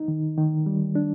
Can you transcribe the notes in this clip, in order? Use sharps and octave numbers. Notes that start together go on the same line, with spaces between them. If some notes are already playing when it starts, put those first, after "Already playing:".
Already playing: D#4
D#3
D#3
G3
D4